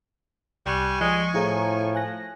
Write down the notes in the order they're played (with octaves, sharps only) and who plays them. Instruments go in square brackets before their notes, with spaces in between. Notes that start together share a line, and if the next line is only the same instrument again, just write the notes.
[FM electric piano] C2 F#6 [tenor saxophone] G3 [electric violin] G#5 C#6
[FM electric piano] F3 [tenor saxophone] G#3
[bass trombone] A2 [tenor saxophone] F3 [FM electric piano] E4 G#4 A#5
[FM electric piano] G#5 F#6 A#6